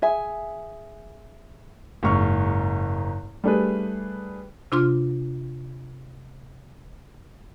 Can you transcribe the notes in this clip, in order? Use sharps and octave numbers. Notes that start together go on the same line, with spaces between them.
G#4 E5 G#5
F#1 G#2 C#6 F6
G3 A3 D4 G#4 B4
C3 D4 F4 C6 F6